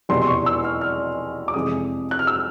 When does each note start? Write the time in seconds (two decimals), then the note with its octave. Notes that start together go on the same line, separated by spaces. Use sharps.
0.09 F1 E2 B2 G3 C6
0.22 C6
0.27 C#6
0.46 E6
0.64 F6
0.81 F6
1.48 D6
1.54 F2 C3 E3 G#3 D#6
2.11 F#6
2.19 F6
2.27 E6